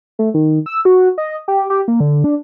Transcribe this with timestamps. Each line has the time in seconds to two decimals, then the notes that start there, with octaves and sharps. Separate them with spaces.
0.19 A3
0.34 D#3
0.66 E6
0.85 F#4
1.18 D#5
1.48 G4
1.70 G4
1.88 A#3
2.00 D3
2.24 D4